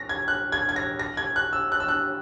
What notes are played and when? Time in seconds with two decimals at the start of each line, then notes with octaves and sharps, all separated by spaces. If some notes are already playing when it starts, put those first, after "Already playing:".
Already playing: A#6
0.09 G#6
0.28 F#6
0.52 G#6
0.69 G#6
0.76 A#6
0.99 A#6
1.17 G#6
1.36 F#6
1.53 E6
1.72 F#6
1.80 E6
1.88 F#6